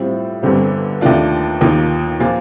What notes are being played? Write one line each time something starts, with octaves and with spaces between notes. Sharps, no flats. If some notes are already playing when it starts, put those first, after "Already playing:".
Already playing: A2 G3 C4 F4
G1 G2 D3 G3 C4
D#2 D#3 A3 D4 F4
D#2 D#3 A#3 F4
A#2 F3 A#3 F4